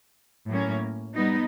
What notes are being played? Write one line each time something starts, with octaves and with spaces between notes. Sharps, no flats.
A2 F#3 A#3 C#4
G3 B3 D#4